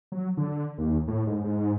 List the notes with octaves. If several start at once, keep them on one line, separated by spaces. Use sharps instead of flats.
F#3
D3
D#2
A2
G#2
G#2